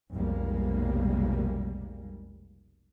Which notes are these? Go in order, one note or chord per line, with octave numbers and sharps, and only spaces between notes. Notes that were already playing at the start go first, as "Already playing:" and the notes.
F1 B1 G3 G#3 A#3